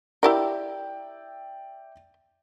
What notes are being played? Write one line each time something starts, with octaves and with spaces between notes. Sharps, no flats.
E4 G4 A#4 D5 E5 G5